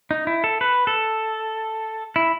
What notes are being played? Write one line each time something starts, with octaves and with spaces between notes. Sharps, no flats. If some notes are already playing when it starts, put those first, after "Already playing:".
D#4
E4
A4
B4
A4
E4